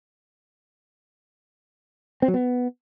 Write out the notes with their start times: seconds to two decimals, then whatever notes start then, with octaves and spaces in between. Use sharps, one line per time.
2.22 C4
2.28 F#3
2.34 B3